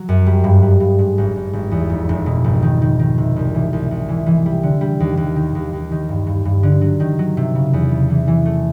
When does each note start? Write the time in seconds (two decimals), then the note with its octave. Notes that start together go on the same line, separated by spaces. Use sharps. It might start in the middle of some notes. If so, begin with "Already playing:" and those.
Already playing: F#3
0.09 F#2
0.26 G3
0.44 G2
0.62 G3
0.80 G2
0.99 G#2
1.18 G#1
1.36 G#1
1.53 G#1
1.71 E2
1.90 F1
2.09 F1
2.26 B2
2.44 G#1
2.63 D#3
2.82 D#3
2.99 D#3
3.18 C3
3.36 C2
3.54 E3
3.73 C2
3.91 C2
4.08 E3
4.26 E3
4.46 G3
4.63 D3
4.81 G3
5.00 D#2
5.17 D#2
5.36 D#3
5.55 D#2
5.73 D#2
5.91 D#3
6.09 G2
6.27 G2
6.45 G2
6.63 D3
6.81 F#3
7.00 D#3
7.19 F#3
7.37 C3
7.55 C#3
7.73 E2
7.91 C#3
8.10 E3
8.28 E3
8.46 A3